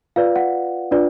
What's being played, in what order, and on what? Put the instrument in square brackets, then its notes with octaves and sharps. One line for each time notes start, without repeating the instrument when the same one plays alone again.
[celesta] F4 B4 D5 F5
F#5
D4 F4 B4 D5